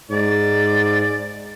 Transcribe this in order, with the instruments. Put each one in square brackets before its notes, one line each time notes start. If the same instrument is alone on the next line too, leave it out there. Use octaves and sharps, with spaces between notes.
[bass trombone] G#2 [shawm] D5